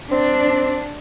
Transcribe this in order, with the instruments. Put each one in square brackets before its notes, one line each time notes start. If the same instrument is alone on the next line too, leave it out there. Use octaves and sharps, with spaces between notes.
[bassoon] C4 [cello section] D4